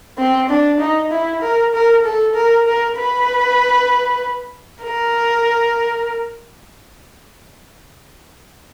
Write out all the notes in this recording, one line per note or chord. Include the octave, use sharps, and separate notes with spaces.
C4
D4
D#4
E4
A#4
A#4
A4
A#4
A#4
B4
A#4